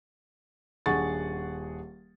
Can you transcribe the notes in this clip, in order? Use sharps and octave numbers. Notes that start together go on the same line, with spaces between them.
D#1 D4 G#4 F#5 C#6 A6